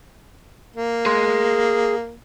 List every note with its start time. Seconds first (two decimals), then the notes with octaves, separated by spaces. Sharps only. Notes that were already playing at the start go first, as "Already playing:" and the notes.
0.76 A#3
1.06 G#4 C6